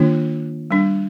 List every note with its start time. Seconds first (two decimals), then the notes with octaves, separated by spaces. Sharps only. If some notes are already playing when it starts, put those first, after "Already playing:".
Already playing: D#3 A#3 D4 F4
0.71 G3 D4